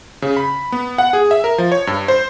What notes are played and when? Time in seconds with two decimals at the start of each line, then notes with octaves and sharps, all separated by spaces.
0.22 C#3
0.37 B5
0.72 B3
0.98 F#5
1.13 G#4
1.31 E5
1.44 A#4
1.58 F3
1.72 C#5
1.87 G2
2.08 C5